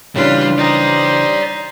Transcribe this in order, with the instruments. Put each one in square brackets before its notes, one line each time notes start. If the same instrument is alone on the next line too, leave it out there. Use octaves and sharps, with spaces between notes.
[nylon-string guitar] C#3 E3 D4 [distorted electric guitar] G3 [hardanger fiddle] F4
[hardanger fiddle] D#4 [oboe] C5 [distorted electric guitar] D5 G5